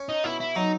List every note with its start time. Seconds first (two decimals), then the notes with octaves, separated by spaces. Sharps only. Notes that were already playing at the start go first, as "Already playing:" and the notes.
Already playing: C#4
0.09 D#4
0.24 B2 E4
0.40 E4
0.55 F#3 D#4